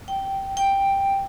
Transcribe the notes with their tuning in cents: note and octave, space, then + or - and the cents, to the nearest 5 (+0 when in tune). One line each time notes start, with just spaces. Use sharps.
G5 -10
G5 +5